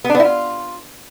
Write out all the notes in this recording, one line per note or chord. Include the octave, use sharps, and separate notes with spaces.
B3
D4
B3
E4
F4